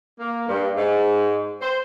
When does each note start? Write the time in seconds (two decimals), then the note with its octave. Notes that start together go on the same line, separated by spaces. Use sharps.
0.19 A#3
0.48 G2
0.76 G#2
1.61 C5